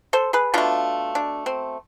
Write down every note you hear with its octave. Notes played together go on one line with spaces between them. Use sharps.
A4 C5
G#4 B4
B2 A3 D4 F4
D4
C4